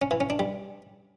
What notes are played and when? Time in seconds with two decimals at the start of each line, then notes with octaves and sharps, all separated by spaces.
0.02 C#4
0.11 E3
0.20 C#4
0.30 D4
0.39 G3